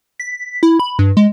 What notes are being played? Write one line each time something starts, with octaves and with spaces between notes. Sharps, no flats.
B6
E4
B5
G2
G#3